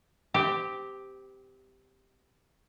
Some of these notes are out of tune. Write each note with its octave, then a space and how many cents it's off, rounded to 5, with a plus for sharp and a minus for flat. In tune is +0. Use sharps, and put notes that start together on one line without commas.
C4 -30 G4 +0